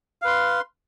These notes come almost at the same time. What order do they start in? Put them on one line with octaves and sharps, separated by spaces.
F5 B4 C6